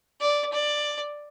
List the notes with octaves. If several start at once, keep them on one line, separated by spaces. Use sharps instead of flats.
D5
D5